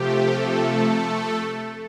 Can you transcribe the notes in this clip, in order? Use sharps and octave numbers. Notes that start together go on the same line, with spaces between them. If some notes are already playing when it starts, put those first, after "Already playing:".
Already playing: C3 F3 A3 G4
A3 A4